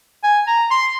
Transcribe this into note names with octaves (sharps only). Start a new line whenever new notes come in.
G#5
A#5
C6